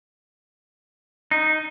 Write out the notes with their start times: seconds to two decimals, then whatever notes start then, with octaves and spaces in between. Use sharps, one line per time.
1.31 D#4